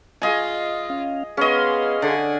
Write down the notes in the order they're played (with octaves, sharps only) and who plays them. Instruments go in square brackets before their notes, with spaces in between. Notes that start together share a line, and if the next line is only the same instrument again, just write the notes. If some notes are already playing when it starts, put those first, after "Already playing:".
[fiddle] F4 [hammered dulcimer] G#4 D#5 G#5
[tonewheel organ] C#4 F5
[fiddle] B3 [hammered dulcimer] C#4 D#5 [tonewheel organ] G#4 F5 C6
[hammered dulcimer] D3 [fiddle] F#5 G#5